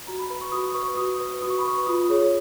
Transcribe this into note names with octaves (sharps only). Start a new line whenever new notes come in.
F#4 A#5
B5
B4 B5
C#6
F#4 D#6
B4 C#6
F#4 D#6
B4
F#4 D#6
C#6
B5
B4 C#6
F4 D#6
G#4 C#5